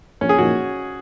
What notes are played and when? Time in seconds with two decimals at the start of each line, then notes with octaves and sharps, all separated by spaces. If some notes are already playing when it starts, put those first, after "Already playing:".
0.21 A#1 C#4
0.29 G#4
0.38 A#2 F3 A#3 D#4 F#4